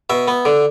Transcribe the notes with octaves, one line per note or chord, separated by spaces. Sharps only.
B2 E5
B3
D3